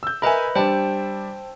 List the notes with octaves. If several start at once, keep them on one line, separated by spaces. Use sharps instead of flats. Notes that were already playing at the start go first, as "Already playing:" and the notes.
E6 G6
A#4 B4 D#5 E5 G#5 B5
G3 D4 C5 G5 A5